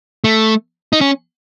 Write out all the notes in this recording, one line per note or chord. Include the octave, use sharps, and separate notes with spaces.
A3
D#4
C#4